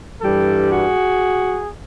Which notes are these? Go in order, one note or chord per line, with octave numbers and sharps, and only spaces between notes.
G2 E3 G3 G4 A4
F#4 G#4